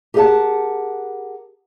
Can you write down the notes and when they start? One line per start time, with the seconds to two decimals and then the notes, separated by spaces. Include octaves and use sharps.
0.14 G4 G#4 A#4 D#5 F#5 A5